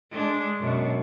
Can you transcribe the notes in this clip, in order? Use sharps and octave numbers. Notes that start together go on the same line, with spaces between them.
G#3 D4
F#2 B2